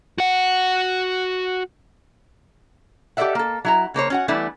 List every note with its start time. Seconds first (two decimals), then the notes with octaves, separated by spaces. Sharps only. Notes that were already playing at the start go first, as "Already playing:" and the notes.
0.18 F#4 F#5
3.17 G4 A4 B4 D5 E5 F#5
3.35 A#3 A4
3.65 F#3 E4 A#5
3.94 C#3 A#3 C5 C#5
4.10 C#4 F#4 F#5
4.28 E3 G3 A3 B3 D4 E4